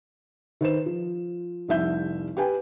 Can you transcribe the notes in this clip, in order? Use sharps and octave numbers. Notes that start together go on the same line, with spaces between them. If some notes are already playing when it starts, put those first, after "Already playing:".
D#3 B4 C5 E7
F3
F1 C2 E5 G6
G4 B4 G5 G#5